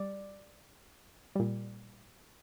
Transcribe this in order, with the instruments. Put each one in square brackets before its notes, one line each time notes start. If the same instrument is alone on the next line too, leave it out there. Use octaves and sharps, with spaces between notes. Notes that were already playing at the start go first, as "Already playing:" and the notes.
Already playing: [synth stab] G3 D5
A#2 G3